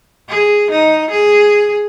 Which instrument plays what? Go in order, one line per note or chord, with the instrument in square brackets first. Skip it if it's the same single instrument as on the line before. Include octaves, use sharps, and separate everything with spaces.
[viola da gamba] G#4
D#4
G#4